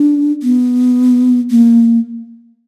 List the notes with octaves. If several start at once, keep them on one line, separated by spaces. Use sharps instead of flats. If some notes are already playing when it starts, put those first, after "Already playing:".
Already playing: D4
B3
A#3